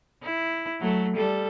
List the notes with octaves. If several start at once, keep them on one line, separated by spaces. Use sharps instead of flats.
E4
F#3 A3
G3 A4